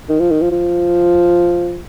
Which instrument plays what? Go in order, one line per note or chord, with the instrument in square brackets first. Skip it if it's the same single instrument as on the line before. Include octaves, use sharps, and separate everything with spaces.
[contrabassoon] D#3
F3
D#3
F3
F3